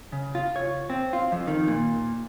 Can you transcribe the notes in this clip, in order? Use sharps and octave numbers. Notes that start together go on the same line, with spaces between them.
C#3
F4
C#5
C4
F4
F2
D#3
A#2